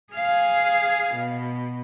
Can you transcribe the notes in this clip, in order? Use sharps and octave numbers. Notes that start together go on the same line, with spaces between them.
G#4 F5
B2